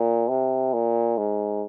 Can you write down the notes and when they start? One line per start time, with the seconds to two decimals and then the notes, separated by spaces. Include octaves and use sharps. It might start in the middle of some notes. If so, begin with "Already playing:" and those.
Already playing: A#2
0.29 C3
0.73 A#2
1.18 G#2